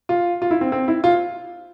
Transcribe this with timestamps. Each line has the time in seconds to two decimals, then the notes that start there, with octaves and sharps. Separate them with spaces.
0.09 F4
0.42 F4
0.51 E4
0.61 C4
0.72 C4
0.88 E4
1.04 F4